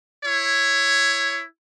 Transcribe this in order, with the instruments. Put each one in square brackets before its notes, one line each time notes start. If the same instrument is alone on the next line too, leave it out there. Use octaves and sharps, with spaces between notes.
[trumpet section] E4 C#5